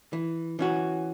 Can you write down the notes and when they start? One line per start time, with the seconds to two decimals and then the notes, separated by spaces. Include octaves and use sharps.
0.13 E3
0.59 E3 C#4 F#4